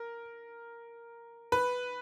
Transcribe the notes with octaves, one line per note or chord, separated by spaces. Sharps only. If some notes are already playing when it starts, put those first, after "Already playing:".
Already playing: A#4
B4